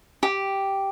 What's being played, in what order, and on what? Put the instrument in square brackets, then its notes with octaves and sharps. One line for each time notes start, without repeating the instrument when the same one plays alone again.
[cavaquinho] G4